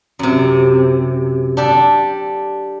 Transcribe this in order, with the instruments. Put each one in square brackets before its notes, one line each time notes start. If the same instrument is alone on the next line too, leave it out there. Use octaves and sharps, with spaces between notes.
[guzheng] F#2 C3
D4 G4 A4